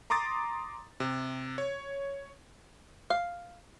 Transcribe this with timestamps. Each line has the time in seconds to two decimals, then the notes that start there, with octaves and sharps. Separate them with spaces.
0.10 A#5 C6 D6 D#6 A6
1.00 C3
1.58 C#5
3.10 F5